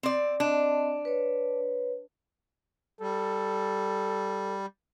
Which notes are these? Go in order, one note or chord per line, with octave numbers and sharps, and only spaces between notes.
C4 D5
C4 D4 D#5
B4 C#5
G3 A4